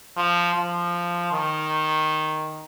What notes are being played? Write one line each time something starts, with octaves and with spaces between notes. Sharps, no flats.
F3
F3
D#3